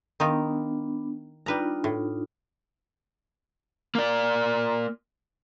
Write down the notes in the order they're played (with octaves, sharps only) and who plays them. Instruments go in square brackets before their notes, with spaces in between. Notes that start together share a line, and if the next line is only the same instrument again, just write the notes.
[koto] D#3 D#4 F4 [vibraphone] B3 D4
[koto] G3 B4 A#5 [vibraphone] D4 D#4 F4
[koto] A2
[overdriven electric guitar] A#3 D5